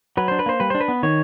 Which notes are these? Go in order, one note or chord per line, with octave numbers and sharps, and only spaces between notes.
F#3 B4
D4 C5
B4
A#3 C5
G3 B4
D4 C5
B4
B3
D#3 C#5